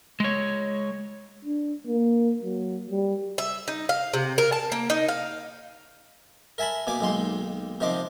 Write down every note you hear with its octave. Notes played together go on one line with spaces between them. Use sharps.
G#3 C#5
D4
A#3
F#3
G3
E5
D#4
F5
C3
A#4
A5
A#3
D#4
F5
A#4 E5 G#5 A5 B5
B2 A#3 G#5 D6
B1 D#3 G#3 A#3 C6
C3 D#3 F3 C5 D#5 D6